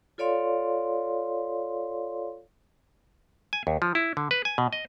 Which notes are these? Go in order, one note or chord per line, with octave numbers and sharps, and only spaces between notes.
F4 A4 C#5 D5 F5 C6
G#5
D#2
F3
E4
D3
B4
G#5
B2
D#5